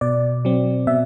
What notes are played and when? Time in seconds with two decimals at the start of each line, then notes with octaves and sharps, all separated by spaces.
0.01 B2 D5
0.45 F#3 C4
0.87 B2 E5